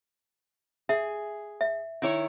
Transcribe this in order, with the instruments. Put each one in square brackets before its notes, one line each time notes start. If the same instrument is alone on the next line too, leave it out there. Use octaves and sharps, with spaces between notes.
[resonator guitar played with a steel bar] G#4 [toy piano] E5
[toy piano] E5
[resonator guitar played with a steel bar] D#3 E4 C#5